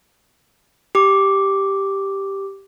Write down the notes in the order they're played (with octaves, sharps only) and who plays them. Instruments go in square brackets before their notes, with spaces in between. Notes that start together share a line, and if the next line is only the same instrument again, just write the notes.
[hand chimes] G4 D6